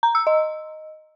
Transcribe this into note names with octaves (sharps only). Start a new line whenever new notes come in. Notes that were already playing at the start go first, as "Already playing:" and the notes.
A#5
E6
D#5